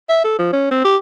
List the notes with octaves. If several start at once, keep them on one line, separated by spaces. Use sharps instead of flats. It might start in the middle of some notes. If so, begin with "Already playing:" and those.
E5
A4
F3
C#4
C4
G4